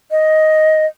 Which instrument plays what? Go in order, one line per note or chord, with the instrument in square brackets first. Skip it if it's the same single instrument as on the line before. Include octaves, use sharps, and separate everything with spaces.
[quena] D#5